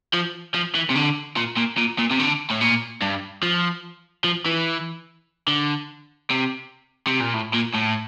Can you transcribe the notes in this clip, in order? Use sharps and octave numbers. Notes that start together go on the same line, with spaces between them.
F3
F3
E3
C3
D3
A#2
A#2
A#2
A#2
C3
D3
A2
A#2
G2
F3
F3
E3
D3
C3
C3
A#2
A2
A#2
A2